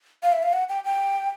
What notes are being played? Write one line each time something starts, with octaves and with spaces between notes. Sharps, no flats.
F5
E5
F5
F#5
G5
G5